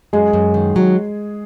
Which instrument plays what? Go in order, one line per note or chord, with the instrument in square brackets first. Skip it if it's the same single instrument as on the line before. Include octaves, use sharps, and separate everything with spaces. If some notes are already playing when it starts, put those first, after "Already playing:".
[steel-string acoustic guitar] F#2 [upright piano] G#3 G#4
[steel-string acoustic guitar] F#2
D#3
F#3